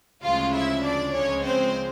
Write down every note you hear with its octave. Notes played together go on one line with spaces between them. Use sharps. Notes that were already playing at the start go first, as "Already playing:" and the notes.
D2 C#3 F3 G#3 F4 F5
E4 E5
D4 D5
C#2 C#3 F3 G#3 C#4 C#5
C4 C5